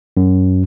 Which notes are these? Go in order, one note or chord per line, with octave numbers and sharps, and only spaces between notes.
F#2